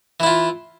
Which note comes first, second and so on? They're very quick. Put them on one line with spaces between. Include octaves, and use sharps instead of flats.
E3 E4 F4